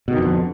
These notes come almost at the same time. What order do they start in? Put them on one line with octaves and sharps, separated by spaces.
B2 D#3 F2 D3